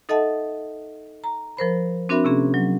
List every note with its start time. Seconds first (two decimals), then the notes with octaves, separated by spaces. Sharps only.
0.09 D#4 A4 D#5 E5 F#5 A5
1.24 A#5
1.57 F3 A#4 C5 B5
2.09 C4 D4 F#4 A#4 E5 B5
2.24 C3 A#3 C#4 G#4
2.54 F#3